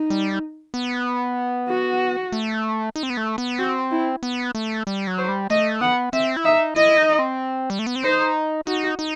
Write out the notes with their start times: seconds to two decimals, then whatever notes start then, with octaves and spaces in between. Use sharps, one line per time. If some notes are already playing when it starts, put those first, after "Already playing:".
Already playing: D#4
0.10 G3
0.74 B3
1.69 F#4
2.32 A3
2.96 D#4
3.03 C4
3.10 B3
3.17 A3
3.38 B3
3.59 C4 F#4
3.91 E4
4.23 B3
4.55 A3
4.87 G3
5.07 F#3
5.18 C5
5.28 G3
5.50 A3 D#5
5.81 B3 F#5
6.13 C4 E5
6.36 E4
6.45 D#4 E5
6.76 E4 D#5
6.98 D#4
7.19 C4
7.70 G3
7.79 A3
7.87 B3
7.96 C4
8.04 D#4 C5
8.67 D#4 F#4
8.99 D#4